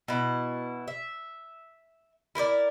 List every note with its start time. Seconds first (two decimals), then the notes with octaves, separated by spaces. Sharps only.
0.08 B2 E4
0.88 E5
2.35 E4 A#4 C5 D5